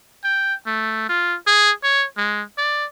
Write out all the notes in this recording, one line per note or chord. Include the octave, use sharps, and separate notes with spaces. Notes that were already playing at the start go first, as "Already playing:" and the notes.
G5
A3
F4
G#4
C#5
G#3
D5